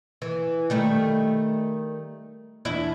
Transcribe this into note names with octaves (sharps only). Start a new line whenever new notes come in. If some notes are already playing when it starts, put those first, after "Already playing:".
E3
D#3 G3 A3
E2 D4 E4